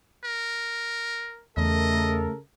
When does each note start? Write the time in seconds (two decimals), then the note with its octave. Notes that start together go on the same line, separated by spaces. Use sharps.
0.24 A#4
1.57 E2 C#3 A3 A4 A#4 D#5